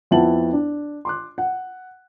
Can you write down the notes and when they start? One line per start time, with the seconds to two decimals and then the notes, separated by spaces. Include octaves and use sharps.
0.11 F2 B3 E4 F#5 A5 F#7
0.53 D4
1.05 C6 D6 F#6
1.38 F#5